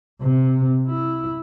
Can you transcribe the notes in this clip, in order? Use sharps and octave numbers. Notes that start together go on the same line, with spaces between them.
C3
E4